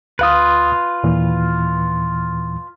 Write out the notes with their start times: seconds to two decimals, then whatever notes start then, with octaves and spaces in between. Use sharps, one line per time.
0.19 D2 F4 B4 F5 D#6
1.04 D#2 A#2 E3